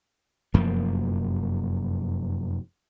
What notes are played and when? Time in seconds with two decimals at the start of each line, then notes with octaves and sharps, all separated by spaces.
0.54 F1 F#2 F3 A#3